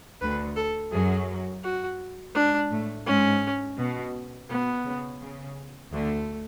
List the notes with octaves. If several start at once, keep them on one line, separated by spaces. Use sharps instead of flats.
D2 D3 B4
A4
F#2 F#3 G#4
F#4
G#2 G#3 D4
A2 A3
G#2 G#3 C#4
B2
B2 B3
C#3
C#3
D2 D3 A3